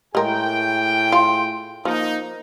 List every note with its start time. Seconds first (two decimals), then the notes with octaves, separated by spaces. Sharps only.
0.15 A2 G#3 G#4 A#4 G5
1.12 F4
1.85 F3 A#3 D#4